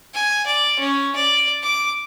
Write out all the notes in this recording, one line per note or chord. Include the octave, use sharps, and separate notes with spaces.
G#5
D5
C#4
D5
D6